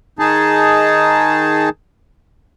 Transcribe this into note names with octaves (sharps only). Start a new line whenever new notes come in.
D#3 D#4 G#4 A5